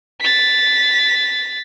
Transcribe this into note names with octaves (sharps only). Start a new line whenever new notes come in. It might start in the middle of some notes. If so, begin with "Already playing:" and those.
A6 B6